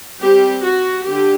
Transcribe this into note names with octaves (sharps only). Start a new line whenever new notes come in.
G3 C4 G4
F#4
D3 G4